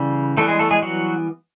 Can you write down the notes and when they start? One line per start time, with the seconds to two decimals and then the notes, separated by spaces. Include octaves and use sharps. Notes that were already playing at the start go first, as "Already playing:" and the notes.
Already playing: C#3 E3 G3
0.37 E3 G3 A3 B3 A4
0.48 G#3 G#4
0.59 A3 A4
0.71 G#3 G#4
0.82 F#3 F#4